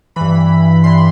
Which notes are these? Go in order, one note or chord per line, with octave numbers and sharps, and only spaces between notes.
G2 E3 B5
G2 E3 C6